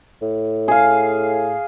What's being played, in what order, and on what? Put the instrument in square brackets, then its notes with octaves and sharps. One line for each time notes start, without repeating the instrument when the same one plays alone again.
[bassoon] A2
[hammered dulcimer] G#4 F5